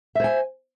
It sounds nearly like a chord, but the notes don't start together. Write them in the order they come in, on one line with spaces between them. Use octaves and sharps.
E5 C5 G#5